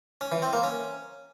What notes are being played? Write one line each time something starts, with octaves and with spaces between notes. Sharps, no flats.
C#4
E3
C4
A#3
C#4